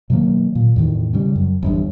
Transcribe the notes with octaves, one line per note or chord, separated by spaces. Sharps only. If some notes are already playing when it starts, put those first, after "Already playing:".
B2 D#3 F#3 A#3
A#2
E2 A2 D#3
C#3 G3
F#2
G1 E2 G2